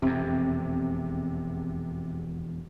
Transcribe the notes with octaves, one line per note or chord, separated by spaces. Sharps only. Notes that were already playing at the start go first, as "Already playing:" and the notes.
E1 F2 C3